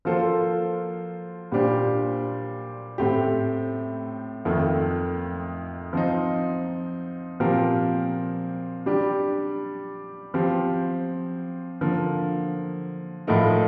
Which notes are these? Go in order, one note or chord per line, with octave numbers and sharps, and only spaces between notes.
F3 A#3 F4 A4 C5
A#2 G3 D4 G4 C5
A2 A3 C4 G4
F2 D#3 A3
F3 C4 D#4
A#2 F3 C4 G4 A#4
G3 D4 G4
F3 C4 G4
D3 F3 A#3
A2 F3 A3 D#4 A#4